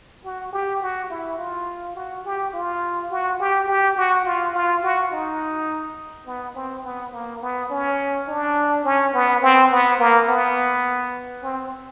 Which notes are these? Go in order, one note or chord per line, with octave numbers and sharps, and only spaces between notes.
F#4
G4
F#4
E4
F4
F#4
G4
F4
F#4
G4
G4
F#4
F4
F4
F#4
D#4
B3
C4
B3
A#3
B3
C#4
D4
C#4
B3
C4
B3
A#3
B3
C4